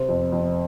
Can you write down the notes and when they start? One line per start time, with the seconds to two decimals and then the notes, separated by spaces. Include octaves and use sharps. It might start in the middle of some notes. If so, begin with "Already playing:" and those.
Already playing: C3 C5
0.09 F2
0.32 F2